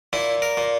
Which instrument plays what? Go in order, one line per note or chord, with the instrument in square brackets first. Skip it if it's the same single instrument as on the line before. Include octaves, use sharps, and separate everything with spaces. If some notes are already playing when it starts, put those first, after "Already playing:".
[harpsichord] A#2 E4
A#4
A#2